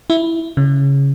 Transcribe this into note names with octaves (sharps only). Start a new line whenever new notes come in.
E4
C#3